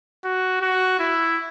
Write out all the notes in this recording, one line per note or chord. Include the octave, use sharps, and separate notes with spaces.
F#4
F#4
E4